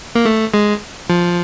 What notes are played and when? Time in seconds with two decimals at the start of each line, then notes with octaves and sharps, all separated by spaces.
0.15 A#3
0.25 A3
0.54 G#3
1.10 F3